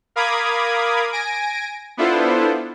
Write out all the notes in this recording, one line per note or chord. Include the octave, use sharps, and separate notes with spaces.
A#4 F5 B5 D6 D#6 G#6
G#5 A#6 D7
B3 D4 E4 F4 A4 C5